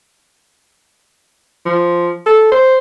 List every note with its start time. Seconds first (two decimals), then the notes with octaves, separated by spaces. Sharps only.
1.66 F3
2.26 A4
2.52 C5